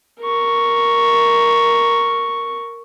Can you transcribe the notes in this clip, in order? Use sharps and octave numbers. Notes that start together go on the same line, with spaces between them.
A#4 C#6